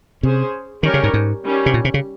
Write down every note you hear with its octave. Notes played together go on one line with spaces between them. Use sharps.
C3 C#4 G#4 C5
D#3 G3 C#4 G4 A#4 C#5
C#3
G#2
G#2
D#3 G3 C#4
C3
A#2
C3
C#3